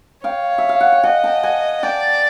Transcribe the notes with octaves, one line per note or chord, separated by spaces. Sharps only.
C#5 F5 G5
E5
F5
F#5
G5
D#5 F#5 G#5
G5 A5
F#5 G#5
D5 G5 A5